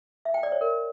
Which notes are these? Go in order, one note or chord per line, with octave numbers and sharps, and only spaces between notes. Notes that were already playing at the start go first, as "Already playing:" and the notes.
E5
G5
D5
C#5
A#4